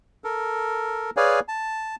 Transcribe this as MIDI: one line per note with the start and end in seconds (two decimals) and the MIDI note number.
0.24 1.10 69
0.24 1.10 70
1.17 1.40 68
1.17 1.40 71
1.17 1.40 73
1.17 1.40 74
1.17 1.40 77
1.17 1.40 80
1.48 1.95 81